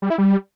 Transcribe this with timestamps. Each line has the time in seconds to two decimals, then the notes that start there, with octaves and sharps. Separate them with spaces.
0.02 G3
0.10 E4
0.18 G3